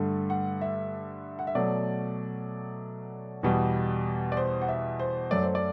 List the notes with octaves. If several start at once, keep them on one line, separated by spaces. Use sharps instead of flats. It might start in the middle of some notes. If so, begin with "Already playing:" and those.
Already playing: G2 D3 A3
F#5
E5
F#5
E5
B2 F#3 A3 D5
E2 B2 G3
D5
C5
F#5
E5
C5
F#2 F#3 A3 D5
C5
D5